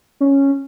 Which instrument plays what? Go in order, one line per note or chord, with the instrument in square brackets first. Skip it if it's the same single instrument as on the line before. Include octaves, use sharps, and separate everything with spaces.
[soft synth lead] C#4